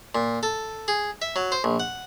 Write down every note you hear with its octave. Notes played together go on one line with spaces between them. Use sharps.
A#2
A4
G#4
E5
F#3
C5
A#1
F#5